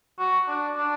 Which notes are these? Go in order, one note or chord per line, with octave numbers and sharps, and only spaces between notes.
F#4
D4
D4